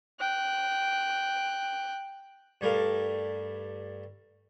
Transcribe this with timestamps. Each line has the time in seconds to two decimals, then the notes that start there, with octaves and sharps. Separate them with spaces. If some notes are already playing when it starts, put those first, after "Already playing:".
0.20 G5 F#6
2.61 G2 G3 A3 A#4 F5